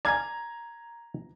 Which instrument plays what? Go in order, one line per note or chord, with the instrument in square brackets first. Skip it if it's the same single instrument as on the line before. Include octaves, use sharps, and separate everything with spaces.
[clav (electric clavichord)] D5 F5 G#5 [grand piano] A#5 G#6